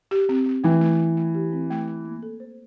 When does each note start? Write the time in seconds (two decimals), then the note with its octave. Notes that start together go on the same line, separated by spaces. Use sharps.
0.11 G4
0.29 C4
0.46 C4
0.64 E3 A3
0.81 A3
0.99 A3
1.17 A3
1.34 G4
1.52 C4
1.70 A3
1.87 A3
2.05 A#3
2.23 A4
2.40 C5